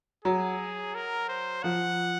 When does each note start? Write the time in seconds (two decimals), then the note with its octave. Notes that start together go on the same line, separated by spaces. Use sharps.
0.25 F#3 G#4
0.94 A#4
1.29 C5
1.63 F3 F#5